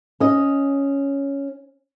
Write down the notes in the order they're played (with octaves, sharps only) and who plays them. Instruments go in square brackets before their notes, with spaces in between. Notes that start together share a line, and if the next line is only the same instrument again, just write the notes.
[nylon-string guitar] C#4 D#5